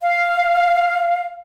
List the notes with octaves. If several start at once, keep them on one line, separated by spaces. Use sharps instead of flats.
F5